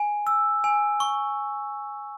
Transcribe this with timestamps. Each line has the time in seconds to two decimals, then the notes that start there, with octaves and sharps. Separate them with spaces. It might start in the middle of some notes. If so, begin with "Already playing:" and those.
Already playing: G#5
0.27 E6
0.64 G#5
1.00 C#6